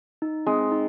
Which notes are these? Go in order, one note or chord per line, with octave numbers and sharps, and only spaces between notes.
D#4
G#3 C4
D#4